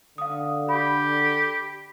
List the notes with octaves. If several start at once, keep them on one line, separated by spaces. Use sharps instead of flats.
D3 F5 D#6
G4 B5